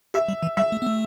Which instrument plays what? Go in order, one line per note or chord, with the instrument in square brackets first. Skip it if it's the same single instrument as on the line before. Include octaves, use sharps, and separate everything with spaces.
[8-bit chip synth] G4 [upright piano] E5
[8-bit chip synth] G3
E3
[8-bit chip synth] G3 [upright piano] E5
[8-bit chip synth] A3
B3
A3